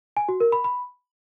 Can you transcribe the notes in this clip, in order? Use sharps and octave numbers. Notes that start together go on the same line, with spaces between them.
G#5
F#4
A#4
B5
B5